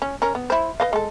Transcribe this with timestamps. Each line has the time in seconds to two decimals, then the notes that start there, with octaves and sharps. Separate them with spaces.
0.02 C#4
0.22 C#4 A#4
0.35 B3
0.50 E4 C5
0.80 B4 D#5 F5
0.93 G#3 A4